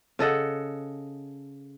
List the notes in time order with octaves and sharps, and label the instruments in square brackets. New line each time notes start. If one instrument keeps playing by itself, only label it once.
[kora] C#3 A4 D#5 F#5